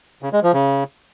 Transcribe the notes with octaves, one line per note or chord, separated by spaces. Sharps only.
C#3
G#3
F3
C#3